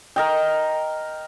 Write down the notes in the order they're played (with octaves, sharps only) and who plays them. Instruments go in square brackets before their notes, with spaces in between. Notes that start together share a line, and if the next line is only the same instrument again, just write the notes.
[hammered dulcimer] A#4 D#5 G5